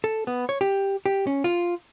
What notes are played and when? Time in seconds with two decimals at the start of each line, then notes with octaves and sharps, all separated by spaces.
0.04 A4
0.27 B3
0.49 C#5
0.61 G4
1.06 G4
1.27 C#4
1.44 F4